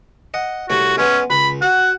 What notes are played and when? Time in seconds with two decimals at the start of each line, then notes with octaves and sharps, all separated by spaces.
0.34 D#5 F#5
0.70 C2 A3 F#4 C#5
0.98 G#3 B3 C#4
1.30 C#2 B5
1.62 F#4 F#5